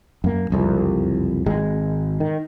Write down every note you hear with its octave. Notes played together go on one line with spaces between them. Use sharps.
F#2 A#3
F#1 C2 F2
G#1 G#3
D#3